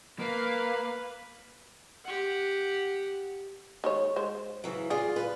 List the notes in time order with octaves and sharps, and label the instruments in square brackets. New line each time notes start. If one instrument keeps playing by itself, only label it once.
[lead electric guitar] A#3 [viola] B4 [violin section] F5
[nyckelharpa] G4 F#5
[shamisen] D#3 G#3 C#5
G#3 C5
[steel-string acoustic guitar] C#3 E3 F#3
[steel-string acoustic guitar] F4 D5 [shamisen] G#4
[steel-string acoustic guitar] B4